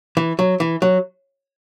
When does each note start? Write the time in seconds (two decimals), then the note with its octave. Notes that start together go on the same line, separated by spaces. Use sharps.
0.17 E3
0.39 F#3
0.60 E3
0.82 F#3